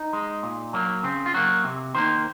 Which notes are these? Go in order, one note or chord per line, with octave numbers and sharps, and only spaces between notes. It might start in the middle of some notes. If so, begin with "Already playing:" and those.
Already playing: D#4
G#3
A#2
F#3 A#3
C#3 C4
F4
F#3 A#3 F#4
C3
D#3 A#3 C5